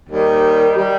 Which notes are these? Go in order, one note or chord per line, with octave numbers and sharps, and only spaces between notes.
D#2 D#3 G3
D#3 G3